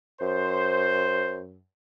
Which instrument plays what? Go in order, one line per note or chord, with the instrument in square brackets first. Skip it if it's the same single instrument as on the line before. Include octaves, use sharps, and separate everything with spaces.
[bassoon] F#2 [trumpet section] C5